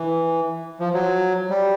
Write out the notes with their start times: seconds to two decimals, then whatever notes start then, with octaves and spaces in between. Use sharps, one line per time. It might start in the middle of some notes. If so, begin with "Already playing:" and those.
Already playing: E3
0.79 F3
0.94 F#3
1.50 G3